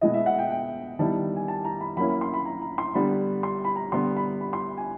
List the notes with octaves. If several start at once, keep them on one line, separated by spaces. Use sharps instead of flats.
B2 G#3 B3 E4 D#5
E5
F#5
G5
G5
D#3 G3 B3 E4 A5
G#5
A5
A#5
B5
F#3 A#3 C#4 E4 B5
B5
C6
B5
A#5
A#5
C6
D3 G3 B3 B5
C6
B5
A#5
D3 G3 B3 C6
B5
B5
C6
G#5